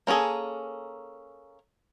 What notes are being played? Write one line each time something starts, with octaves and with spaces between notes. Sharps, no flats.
A#3 C#4 E4 G#4 A4